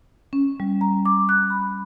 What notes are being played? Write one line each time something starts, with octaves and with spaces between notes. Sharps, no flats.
C#4
G3
A#5
D6
F#6
B5